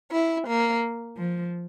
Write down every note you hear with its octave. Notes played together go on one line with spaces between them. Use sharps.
E4
A#3
F3